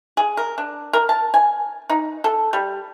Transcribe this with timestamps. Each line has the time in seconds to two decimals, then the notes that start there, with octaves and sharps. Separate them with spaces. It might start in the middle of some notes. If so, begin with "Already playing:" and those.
0.17 G#4
0.37 A#4
0.58 D4
0.93 A#4
1.09 A5
1.34 G#5
1.89 D#4
2.24 A4
2.53 G3